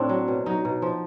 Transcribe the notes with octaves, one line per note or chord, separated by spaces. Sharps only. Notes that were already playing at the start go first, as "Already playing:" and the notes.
Already playing: A2 C4 D4
F#3
B2
F#3 D#4
B2
F3